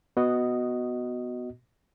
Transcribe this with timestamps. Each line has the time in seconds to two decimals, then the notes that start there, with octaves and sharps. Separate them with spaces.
0.17 B3 F#4 D#5